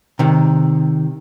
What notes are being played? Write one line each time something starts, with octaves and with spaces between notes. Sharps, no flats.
C3 D#3